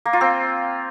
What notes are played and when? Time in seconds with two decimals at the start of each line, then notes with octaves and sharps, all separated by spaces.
0.05 A#3
0.13 F4
0.21 C4